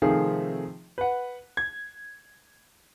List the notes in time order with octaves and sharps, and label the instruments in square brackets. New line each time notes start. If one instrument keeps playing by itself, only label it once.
[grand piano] C3 D#3 F3 A3 C4 G#4
B4 F#5
G#6